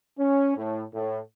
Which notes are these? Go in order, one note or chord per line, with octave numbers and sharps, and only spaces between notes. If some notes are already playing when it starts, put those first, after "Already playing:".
C#4
A2
A2